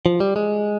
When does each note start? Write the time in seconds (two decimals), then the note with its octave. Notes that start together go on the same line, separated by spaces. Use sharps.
0.06 F3
0.20 G3
0.36 G#3